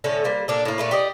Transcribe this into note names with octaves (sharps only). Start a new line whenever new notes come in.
A2 D3 C#4 A4
G3 A#3 C5
A#2 D4 A4
A2 A#3
A#2 A3 B4
G4 D5 D#5